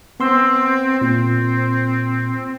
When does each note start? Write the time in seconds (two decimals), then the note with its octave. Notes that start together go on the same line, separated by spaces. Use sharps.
0.20 B3 C4 C6 E6
1.01 A#2 C4